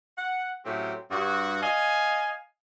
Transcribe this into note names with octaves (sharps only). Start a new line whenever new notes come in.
F#5
A2 F#3 C4 C#4 G4
G2 F#4
D#5 F5 G#5